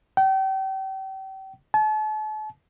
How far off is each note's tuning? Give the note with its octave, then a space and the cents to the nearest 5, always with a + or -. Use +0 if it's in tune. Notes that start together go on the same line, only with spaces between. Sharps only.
G5 -35
A5 -40